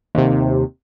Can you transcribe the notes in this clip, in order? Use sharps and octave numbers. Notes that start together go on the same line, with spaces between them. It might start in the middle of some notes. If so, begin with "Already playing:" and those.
D#2 C3